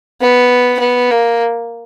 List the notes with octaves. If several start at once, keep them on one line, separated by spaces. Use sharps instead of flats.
B3
B3
A#3